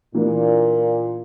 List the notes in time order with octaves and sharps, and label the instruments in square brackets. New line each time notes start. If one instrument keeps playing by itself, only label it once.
[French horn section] A#2 [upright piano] E3 A#3 D4